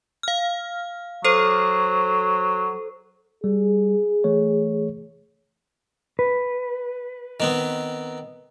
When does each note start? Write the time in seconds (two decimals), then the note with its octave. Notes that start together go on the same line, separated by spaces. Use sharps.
0.23 F5 F6
1.24 F#3 A4 C5
3.44 G3 G#4
4.24 E3 A3 C#5
6.19 B4
7.40 D#3 B3 C4